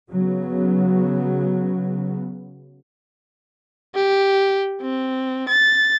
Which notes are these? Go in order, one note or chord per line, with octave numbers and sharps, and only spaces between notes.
C#3 F#3 B3
G4
C4
A6